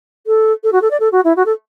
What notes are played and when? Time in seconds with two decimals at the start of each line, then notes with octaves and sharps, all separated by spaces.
0.26 A4
0.63 A4
0.72 F#4
0.81 A4
0.90 D5
1.00 A4
1.12 F#4
1.24 E4
1.36 F#4
1.45 A4